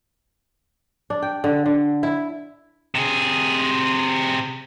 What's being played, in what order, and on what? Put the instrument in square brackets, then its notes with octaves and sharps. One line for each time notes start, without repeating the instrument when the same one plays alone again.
[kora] D4
G5
D3
D3
E4
[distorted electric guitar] C3 G#4